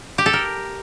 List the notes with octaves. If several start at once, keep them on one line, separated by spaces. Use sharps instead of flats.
G4
A4
A#4